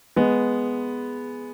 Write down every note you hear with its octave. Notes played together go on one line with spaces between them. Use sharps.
G#3 B3